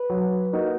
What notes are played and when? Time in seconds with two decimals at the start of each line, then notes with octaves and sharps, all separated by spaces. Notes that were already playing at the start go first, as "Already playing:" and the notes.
Already playing: B4
0.10 F#3
0.53 A#3 D#4 F#4